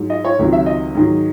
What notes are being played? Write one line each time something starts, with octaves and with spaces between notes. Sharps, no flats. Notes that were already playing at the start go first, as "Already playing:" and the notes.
Already playing: G#2 F#3
D#5
C#5
C#2 C3 D#3 F#3
E5
D#5
G#2 D#3 F#3